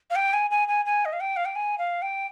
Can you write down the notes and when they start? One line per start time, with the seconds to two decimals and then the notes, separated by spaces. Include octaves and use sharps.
0.10 F5
0.16 G5
0.33 G#5
0.51 G#5
0.68 G#5
0.86 G#5
1.05 D#5
1.13 F5
1.21 G5
1.36 F5
1.45 G5
1.56 G#5
1.78 F5
2.02 G5